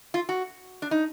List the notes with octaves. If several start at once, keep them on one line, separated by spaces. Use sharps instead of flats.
F4
F#4
D4
D#4